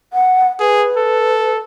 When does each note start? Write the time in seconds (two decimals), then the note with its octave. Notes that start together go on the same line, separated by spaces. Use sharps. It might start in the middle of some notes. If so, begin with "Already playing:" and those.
0.13 F#5
0.60 G#4 B4
0.97 A4